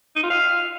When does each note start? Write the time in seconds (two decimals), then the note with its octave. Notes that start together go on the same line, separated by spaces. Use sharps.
0.16 D#4
0.23 F4
0.30 F5